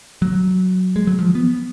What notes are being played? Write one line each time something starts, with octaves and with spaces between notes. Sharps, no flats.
F#3
G#3
F#3
F3
B3